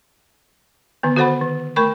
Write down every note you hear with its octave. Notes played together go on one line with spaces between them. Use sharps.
D3 D#3 B3
F#4 A4 C5 F#5 B5
D#3
A3 A#4 B5 C#6